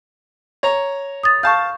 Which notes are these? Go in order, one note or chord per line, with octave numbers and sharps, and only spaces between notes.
C#5 A#5
D#6 A6
F5 A5 C#6 G6